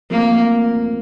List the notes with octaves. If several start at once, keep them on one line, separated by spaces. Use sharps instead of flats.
F3 A3 A#3 C4 F4 A#4